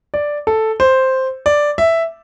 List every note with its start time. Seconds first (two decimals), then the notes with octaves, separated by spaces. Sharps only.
0.14 D5
0.47 A4
0.80 C5
1.46 D5
1.78 E5